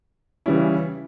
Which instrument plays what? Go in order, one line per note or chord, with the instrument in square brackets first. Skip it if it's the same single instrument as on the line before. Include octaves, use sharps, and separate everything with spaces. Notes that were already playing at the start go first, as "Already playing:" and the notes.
[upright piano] C#3 E3 G3 C#4 E4